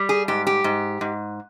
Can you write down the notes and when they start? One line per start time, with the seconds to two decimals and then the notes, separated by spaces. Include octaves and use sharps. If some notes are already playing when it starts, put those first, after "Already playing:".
Already playing: G3
0.09 G#4
0.28 G#2 G4
0.47 G4
0.64 G#2
1.01 G#2